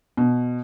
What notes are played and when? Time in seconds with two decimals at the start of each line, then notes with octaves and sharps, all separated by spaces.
0.17 B2